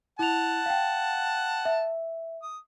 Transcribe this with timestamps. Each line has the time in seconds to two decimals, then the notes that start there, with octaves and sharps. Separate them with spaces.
0.19 E4 F#5 A5 F7
0.66 F5 G5
1.65 E5
2.42 D#6